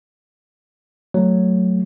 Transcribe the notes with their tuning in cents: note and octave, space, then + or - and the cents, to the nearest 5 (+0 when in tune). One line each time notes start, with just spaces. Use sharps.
F#3 +0 A3 +0 C#5 +0